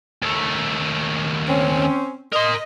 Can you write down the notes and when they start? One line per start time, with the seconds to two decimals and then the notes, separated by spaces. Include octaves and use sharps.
0.22 D#2 A3
1.49 C4 C#4
2.33 A#4 D#5 C6